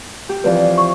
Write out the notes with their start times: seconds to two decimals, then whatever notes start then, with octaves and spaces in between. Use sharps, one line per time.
0.29 G4
0.44 E3 F3 C4 B4 D5
0.78 C#6